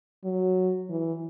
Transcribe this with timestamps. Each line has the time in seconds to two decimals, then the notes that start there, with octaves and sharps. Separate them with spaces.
0.24 F#3
0.90 E3